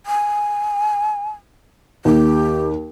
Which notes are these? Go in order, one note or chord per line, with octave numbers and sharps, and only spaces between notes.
G#5
D#2 G4